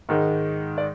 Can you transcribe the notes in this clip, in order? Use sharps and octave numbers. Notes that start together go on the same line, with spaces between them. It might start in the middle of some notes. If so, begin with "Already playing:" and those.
G#2 D#3 G#3
D5